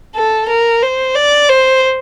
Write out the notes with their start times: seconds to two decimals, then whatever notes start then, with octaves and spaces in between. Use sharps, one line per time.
0.16 A4
0.49 A#4
0.83 C5
1.15 D5
1.50 C5